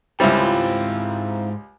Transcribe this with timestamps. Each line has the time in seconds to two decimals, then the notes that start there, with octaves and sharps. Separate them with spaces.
0.20 C#2 G#2 G3 C4 E4 F4 G5